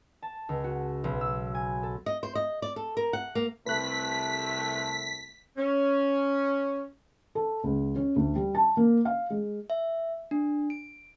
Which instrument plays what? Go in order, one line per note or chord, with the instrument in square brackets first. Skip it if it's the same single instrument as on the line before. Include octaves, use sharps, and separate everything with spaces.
[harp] A5
C#2
F#4
B1
E6
G#5
A4
[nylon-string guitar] D#5
C5
D#5
D5
A4
A#4
F#5
A#3
[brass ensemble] C2 C3 A3 [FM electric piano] B4 F#6 [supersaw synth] B6
[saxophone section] C#4
[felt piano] A4
C#2
C#4
D2
G3
A5
A#3
F5
G#3
[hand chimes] E5
D4
D7